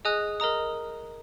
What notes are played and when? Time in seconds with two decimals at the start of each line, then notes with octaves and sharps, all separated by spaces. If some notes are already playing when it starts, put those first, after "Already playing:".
0.05 G#4 D#5 G#5 D#6 F#6
0.40 A#4 D#5 A#5 D#6